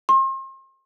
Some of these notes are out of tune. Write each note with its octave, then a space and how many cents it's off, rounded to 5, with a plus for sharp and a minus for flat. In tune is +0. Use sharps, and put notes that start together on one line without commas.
C6 +40